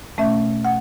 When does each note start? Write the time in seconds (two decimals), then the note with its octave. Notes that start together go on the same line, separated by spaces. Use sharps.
0.18 B2 A3 C#4 E5
0.65 F#5